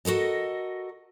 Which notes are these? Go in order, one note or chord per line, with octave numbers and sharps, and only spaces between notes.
F#4 A4 A#4 D#5